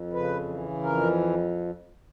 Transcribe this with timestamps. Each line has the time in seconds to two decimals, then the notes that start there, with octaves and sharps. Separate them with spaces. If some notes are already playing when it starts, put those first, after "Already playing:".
Already playing: F2
0.13 C#3 B4
0.47 E3
0.83 F2 A#4